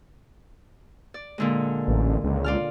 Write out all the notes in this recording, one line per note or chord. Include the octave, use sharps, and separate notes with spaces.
D5
A#2 D3 G#3
A1
C#2
F4 D5 F6